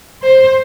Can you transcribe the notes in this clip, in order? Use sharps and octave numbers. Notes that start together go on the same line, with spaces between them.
C5